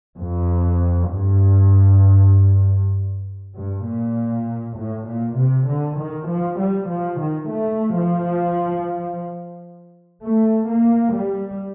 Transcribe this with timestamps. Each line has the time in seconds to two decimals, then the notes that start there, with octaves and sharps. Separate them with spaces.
0.21 F2
1.12 G2
3.54 G2
3.85 A#2
4.77 A2
5.07 A#2
5.37 C3
5.68 D3
5.99 D#3
6.29 F3
6.59 G3
6.90 F3
7.20 D#3
7.50 A3
7.96 F3
10.23 A3
10.69 A#3
11.15 G3